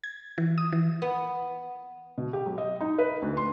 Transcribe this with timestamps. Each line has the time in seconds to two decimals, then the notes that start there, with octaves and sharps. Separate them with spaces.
0.04 G#6
0.38 E3
0.58 D#6
0.72 E3
1.02 B3
2.18 B2
2.33 G4
2.46 F#3
2.58 D#5
2.81 D#4
2.98 B4
3.22 D2
3.37 C6